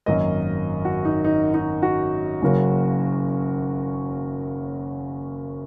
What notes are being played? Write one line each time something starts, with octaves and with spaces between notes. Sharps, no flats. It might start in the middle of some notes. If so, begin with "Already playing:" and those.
G#1 F#2 F#3 A#3 A#4 D#5
F#4
D#4
D#4
D#4
F#4
F#1 F#2 C#3 F#3 A#3